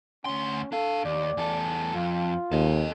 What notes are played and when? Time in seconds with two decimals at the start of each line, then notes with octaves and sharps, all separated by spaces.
0.25 D2 C#4 C6
0.72 D4 A4 F5
1.05 D#2 D5
1.37 E2 A4
1.94 F2 F4
2.52 D#2 A4 D#5